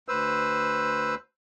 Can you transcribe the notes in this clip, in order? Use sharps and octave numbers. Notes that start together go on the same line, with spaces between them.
D2 B4 C5 E6